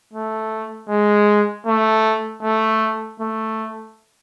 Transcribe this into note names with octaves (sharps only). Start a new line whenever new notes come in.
A3
G#3
A3
A3
A3